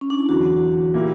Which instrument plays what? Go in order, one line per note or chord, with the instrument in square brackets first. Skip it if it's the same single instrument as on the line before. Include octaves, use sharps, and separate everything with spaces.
[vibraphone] C#4
D4
E4
[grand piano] E2 D3 F#3 [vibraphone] F#4
[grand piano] A#2 A#3 E4 G4